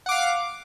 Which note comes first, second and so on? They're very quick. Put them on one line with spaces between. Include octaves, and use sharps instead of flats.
F#5 D6 F5